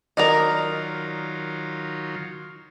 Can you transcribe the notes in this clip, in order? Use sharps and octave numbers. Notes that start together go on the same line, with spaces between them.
D#3 F#3 F4 A#4 D5 D#5